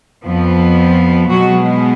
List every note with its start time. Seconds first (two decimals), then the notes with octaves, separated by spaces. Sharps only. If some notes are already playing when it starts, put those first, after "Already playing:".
0.23 F2 F3 B3
1.29 B2 F#3 G#3 B3 F#4